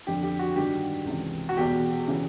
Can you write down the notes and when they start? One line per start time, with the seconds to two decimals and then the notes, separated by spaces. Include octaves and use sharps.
0.07 F2 D3 G4
0.23 G4
0.39 F#4
0.56 G2 D#3 G4
1.06 C#2 C3 E3
1.49 F#4
1.57 E2 B2 G4
2.07 C#3 E3